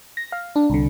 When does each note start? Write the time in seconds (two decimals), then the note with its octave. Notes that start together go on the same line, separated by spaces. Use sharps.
0.17 A#6
0.32 F5
0.56 D4
0.70 C2 D3